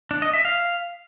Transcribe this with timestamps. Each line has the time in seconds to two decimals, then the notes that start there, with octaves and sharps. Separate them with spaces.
0.11 D4
0.22 D#5
0.33 E5
0.45 F5